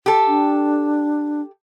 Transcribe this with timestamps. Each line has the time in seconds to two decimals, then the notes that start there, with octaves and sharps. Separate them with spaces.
0.06 G4 A4
0.28 D4